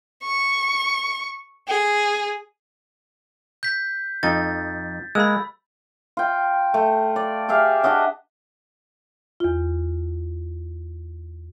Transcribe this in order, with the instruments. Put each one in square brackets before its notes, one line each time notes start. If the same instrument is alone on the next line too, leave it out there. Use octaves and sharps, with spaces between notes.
[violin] C#6
G#4
[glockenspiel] G6 B6
[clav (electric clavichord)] F2 D#4 [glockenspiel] A6
[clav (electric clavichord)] G#3 A#3 [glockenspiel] B5 E6
[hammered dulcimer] F4 G5
A3
D5
G4 G#4 E5 F5
D4 F#4 D#5 E5
[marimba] E2 F4